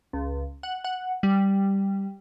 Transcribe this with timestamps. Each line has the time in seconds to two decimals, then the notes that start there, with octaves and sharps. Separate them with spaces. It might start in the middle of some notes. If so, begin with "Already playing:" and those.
0.13 C#2
0.63 F#5
0.84 F#5
1.23 G3